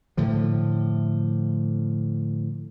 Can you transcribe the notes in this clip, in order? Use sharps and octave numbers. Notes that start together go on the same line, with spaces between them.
A2 D3 F3